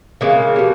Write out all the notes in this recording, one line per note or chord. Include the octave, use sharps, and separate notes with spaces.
C#3 E3 G#3 A#3
B2 G3